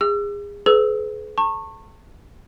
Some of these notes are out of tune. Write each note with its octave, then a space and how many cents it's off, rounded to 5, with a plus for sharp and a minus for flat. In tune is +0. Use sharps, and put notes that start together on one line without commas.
G#4 -30 E6 +40
G#4 +45 B4 +25 E6 +0
A5 +35 C#6 -20